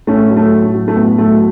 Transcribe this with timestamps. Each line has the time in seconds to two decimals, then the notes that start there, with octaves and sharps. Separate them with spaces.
0.07 A2 A3 C#4
0.30 F#3
0.37 A3
0.52 A2
0.73 F#3
0.88 A3
0.96 A2 B3
1.18 F#3 A3